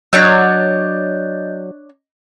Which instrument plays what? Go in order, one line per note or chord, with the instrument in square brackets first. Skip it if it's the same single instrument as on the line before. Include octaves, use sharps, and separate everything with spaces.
[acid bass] F#3 [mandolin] D4 C#5 E6 [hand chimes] D#5 G6